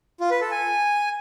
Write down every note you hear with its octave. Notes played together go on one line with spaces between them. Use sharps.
F4
B4
A4
G#5